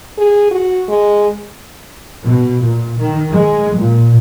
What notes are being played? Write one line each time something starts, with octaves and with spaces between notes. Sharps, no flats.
G#4
F#4
G#3
B2
A#2
D#3
G#3
A#2